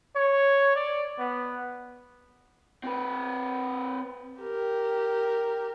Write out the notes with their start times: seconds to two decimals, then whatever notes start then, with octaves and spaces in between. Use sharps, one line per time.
0.16 C#5
0.75 D5
1.19 B3
2.84 C4 B4
4.40 G4 A#4